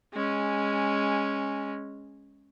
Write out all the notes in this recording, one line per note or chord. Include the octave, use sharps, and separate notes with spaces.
G#3 C#4